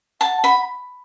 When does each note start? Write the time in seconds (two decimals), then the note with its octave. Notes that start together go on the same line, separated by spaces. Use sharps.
0.21 F#5 A5
0.44 B5